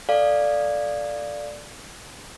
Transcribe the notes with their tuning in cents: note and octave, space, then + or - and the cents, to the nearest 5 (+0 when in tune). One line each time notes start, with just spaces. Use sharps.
A4 +5 D5 +0 F5 +0